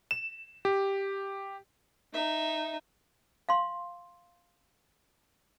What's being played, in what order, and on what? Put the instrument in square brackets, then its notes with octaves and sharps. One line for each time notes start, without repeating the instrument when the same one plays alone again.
[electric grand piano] E7
G4
[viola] D#4 [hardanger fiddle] E5
[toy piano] F5 C6